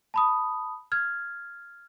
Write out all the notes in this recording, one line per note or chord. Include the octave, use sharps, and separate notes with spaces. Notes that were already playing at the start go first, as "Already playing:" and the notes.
A5 B5 D#6
F6 G#6